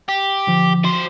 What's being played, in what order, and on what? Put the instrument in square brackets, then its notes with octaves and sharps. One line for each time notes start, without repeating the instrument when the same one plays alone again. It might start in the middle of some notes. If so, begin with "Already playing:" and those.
[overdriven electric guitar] G4
[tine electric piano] D3 F3
[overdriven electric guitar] F#3 C5